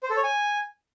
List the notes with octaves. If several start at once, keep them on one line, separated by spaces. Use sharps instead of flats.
C5
A4
C#5
G#5